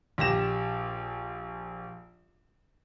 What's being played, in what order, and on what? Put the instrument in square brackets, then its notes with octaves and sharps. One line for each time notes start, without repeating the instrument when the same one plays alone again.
[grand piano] A#1 G4 A#6 E7